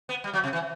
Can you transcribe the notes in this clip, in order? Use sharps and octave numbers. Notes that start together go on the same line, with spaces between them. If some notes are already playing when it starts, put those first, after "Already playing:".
B3
G3
F#3
C3
E3